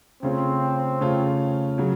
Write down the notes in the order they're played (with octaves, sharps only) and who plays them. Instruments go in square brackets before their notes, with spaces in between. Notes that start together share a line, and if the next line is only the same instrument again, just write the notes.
[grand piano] C#3 A3 C#4 F4 [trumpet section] C4
[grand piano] C#3 A3 C#4 F4
C#3 F#3